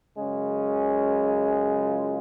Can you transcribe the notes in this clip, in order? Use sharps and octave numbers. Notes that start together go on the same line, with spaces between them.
F#2 C#3 G#3 C#4
F4